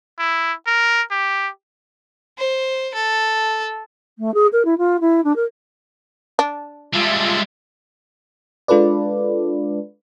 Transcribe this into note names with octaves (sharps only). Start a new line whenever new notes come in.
E4
A#4
G4
C5
A4
A3
G#4
A#4
E4
F4
E4
D4
A#4
D4
G3 G#3 F4 E5 A5
G#3 D4 F4 A4 B4 D5